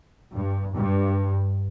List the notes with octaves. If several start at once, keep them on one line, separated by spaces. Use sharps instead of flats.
G2
G2